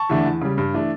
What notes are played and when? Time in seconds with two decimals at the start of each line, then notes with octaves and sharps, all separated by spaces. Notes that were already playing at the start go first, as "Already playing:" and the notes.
Already playing: A5 C#6
0.10 E2 D3 A3 D4
0.26 E2
0.42 C#3 G3
0.58 G2
0.74 E3 A3 D4